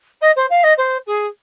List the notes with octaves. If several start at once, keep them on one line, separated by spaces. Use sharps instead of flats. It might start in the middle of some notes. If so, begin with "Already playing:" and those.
D#5
C5
F5
D#5
C5
G#4